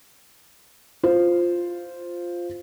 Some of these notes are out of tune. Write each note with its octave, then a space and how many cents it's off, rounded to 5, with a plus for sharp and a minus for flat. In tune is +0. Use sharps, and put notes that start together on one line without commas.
F4 +0 C5 +0